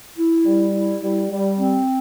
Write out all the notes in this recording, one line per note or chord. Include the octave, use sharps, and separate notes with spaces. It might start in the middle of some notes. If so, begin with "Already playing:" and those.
E4
G3
E4
G3
G3
C4